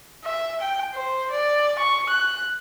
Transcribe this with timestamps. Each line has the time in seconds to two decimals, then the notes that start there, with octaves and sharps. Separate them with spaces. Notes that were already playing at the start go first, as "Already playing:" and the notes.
0.24 E5
0.61 G5
0.94 C5
1.31 D5
1.79 C#6
2.09 F#6